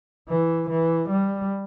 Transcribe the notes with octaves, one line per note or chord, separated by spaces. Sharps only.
E3
E3
G3